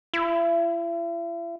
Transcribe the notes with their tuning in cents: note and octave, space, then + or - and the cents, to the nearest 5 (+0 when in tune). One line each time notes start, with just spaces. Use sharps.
E4 +40